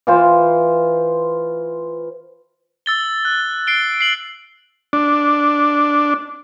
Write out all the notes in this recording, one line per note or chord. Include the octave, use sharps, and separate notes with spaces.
E3 F4 C5
E6 A6 G7
F#6
C7 D7 G7
C7 F#7
D4